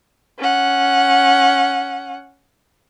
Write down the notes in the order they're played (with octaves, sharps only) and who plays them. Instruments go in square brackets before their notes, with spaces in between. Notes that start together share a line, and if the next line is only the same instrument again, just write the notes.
[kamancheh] C#4 F#5